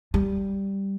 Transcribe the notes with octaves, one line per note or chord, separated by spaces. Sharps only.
G3